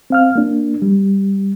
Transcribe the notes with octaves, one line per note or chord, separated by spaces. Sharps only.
C4 F5 F6
A#3 D4
G3